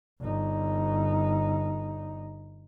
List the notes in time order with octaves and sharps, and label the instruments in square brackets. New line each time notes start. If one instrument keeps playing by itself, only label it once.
[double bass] G1 D#4